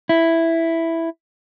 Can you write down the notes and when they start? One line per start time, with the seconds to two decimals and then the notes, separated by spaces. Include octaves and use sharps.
0.09 E4